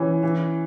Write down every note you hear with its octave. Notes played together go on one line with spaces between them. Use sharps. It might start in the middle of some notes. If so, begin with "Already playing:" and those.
Already playing: E3 C#4
E3